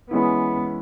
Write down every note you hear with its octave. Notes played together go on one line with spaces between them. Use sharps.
E3 G#3 B3 C#4 E4